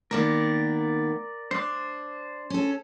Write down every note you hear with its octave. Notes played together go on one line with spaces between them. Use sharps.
D#3 A#3 B3 A#4 D5
D4 C5 D6
C#4 A4